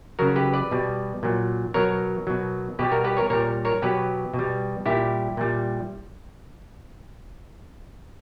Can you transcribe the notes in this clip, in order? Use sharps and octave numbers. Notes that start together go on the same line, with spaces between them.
C#3 F#3 F#4 A#4
G4 B4
B4 D5
B2 G3
A#2 F#3
B2 F#3 A#4 C#5
B2 F#3
B2 G3 G4 B4
F#4 A#4
G4 B4
A#4 C#5
A#2 G3 A#4 C#5
A#4 C#5
B2 F#3 G4 B4
B2
G3
A#2 G3 E4 G4
A#2 G3